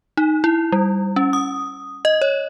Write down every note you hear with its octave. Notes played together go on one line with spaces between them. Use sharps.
D#4
E4
G3
C#4
D#6
D#5
C#5